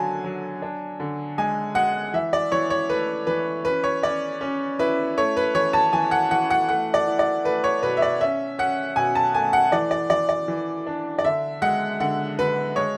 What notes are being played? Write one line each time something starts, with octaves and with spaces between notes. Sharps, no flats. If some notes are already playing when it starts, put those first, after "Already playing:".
Already playing: D3 F#3 D4 G#5 A5
F#3
D4
D3
G#3 G#5
G#3 F#5
E3 E5
D5
E3 C#5
C#5
A3 B4
E3 B4
C#4 B4
C#5
C#4 D5
C#4
E4 B4
A3 C#5
B4
E3 C#5
A5
E3 G#5
F#5
E3 F#5
F#5
A3 F#5
D5
E4
D5
A3 B4
C#5
B2 B4
E5
D5
C#4 E5
C#4 F#5
B2 G#5
A5
A3 G#5
F#5
E3 D5
D5
E3 D5
D5
E3
D4
D5
D3 E5
G#3 F#5
D3 F#5
D3 B4
G#3 C#5